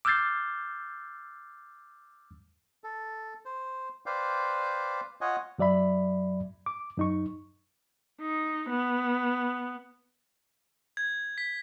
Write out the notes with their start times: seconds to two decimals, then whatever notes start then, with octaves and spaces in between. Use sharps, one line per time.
0.05 D6 E6 F6 G6 A6 C7
2.84 A4
3.45 C5
4.06 B4 C5 D5 F5 G5
5.21 F4 C#5 D#5 F#5 G#5
5.58 F#2 F#3 D5 E5 B5
6.66 D6
6.97 F#2 D#4 C#6
8.21 D#4
8.69 B3
10.97 G#6
11.38 B6